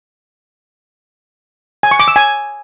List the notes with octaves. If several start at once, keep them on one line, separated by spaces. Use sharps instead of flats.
G#5
C#6
D6
E6
G#5